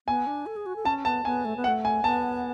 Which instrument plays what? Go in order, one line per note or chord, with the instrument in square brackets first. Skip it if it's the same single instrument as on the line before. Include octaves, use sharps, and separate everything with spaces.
[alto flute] B3 [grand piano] G#5
[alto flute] D4
A4
G#4
F#4
A4
[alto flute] C#4 [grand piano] A5
[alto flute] B3 [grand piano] A5
[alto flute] B3 [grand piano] G#5
[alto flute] A3
B3
[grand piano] F#5
[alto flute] A3
[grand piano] G#5
[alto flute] B3 [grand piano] A5